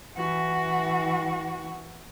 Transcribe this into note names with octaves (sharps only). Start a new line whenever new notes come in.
E3 F#4